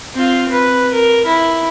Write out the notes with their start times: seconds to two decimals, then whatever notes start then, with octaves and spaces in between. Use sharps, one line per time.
0.14 C4 F4
0.52 B4
0.92 A#4
1.26 E4